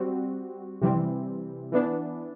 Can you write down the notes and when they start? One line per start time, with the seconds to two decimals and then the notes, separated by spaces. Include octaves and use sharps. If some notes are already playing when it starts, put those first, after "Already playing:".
Already playing: G3 C4 F#4
0.82 C3 E3 G3 C4
1.72 E3 B3 D4